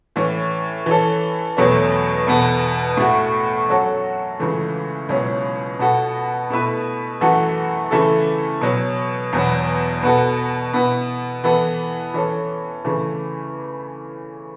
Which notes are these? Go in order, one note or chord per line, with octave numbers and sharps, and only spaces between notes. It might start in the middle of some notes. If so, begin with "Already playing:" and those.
A2 E3 C#4
E3 C#4 A4
E2 B2 F#3 A3 C#4
E2 B2 B3 A4
A2 A3 F#4
F#2 F#3 C#4 F#4 A4
C#2 C#3 E3 A3
C#2 B2 F#3 C#4 E4
B2 B3 F#4 A4
B2 A3 E4 B4
F#2 E3 A3 F#4 A4
C#3 E3 A3 E4 A4
B2 F#3 C#4
E2 B2 F#3 B3
B2 B3 F#4 A4
B2 B3 E4
E3 B3 E4 A4
E3 C#4 A4
C#3 E3 A3